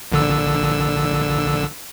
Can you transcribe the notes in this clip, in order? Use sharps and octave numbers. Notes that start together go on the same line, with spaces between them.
A#1 D3 E6